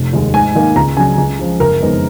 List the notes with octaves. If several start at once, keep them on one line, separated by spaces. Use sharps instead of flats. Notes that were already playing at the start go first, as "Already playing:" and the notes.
Already playing: F1
D#2 D#3 G#3
G#2 G#5
D#3 A#3
C#2 A#5
C#3 F#3 C#4 G#5
C#2
C#3 F3
F#1 A#4
F2 D#3 G#3 B3